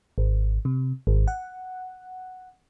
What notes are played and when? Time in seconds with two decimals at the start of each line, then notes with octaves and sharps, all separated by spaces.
0.18 G#1
0.65 C3
1.07 G#1
1.28 F#5